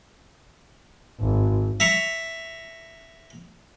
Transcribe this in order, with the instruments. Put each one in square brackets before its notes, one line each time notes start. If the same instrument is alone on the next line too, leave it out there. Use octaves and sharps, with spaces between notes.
[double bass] G#1
[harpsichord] E5 A#5 C#6